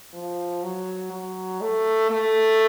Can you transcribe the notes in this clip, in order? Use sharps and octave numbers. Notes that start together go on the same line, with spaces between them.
F3
F#3
F#3
A3
A3